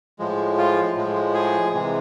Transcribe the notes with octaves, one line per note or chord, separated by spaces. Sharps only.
A2 F3 G#3
F4
A2 F3 G#3
G#4
C3 E3 G#3